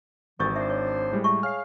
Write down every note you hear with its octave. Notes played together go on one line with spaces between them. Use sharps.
G#1 D2 G2 E3 C#6 G6 A6
D4 C5 E5
C#5
A2 G3 G#3
E5 A5 C#6
G#4 C#5 F5 F6 C7